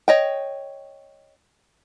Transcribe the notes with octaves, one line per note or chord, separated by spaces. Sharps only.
C#5 D#5 G5